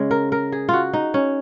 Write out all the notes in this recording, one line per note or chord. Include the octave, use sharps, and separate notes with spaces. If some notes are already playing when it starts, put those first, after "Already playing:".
Already playing: C#3 G#3
A#4
A#4
G#4
F4 F#4
D#4
C#4